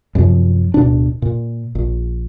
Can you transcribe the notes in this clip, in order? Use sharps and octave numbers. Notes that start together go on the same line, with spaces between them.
F#2 C3 F3
D1 B2 D4
A#2
A#1